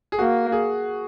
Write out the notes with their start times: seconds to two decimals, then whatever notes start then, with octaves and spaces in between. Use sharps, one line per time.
0.12 G#4
0.19 A#3 F#4
0.52 G#4